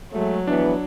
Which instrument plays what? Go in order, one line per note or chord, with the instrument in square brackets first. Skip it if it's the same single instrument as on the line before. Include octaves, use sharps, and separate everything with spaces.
[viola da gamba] F#3 [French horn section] G#3 A3
[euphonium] E3 [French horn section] F3 G#3 B3 [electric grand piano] D4